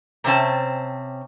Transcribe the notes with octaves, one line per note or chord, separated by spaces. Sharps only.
C3 C4 C#4 A5